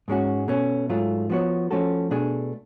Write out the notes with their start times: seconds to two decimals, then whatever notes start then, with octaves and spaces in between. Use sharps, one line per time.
0.08 G#2 G#3 C#4 F#4
0.48 B2 A3 C#4
0.89 G#2 F#3 A3 F4
1.30 F3 B3 F#4 C#5
1.71 F3 A3 C#4 F#4 A4
2.11 B2 A3 D4 G#4